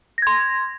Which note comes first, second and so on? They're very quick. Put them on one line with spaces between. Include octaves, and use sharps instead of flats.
A#6 G#6 C6